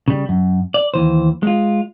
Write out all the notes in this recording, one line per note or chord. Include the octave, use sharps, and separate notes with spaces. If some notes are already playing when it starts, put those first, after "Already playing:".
C#3 G3
F#2
D5
D#2 E3 C5
G#3 F4